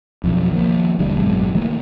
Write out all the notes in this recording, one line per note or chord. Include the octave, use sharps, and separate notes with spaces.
B1 F2
D#3 F3 A#3
E1 D#2 D3 G3
G#1 F#2 B2 G#3
D#3 E3 A3 A#3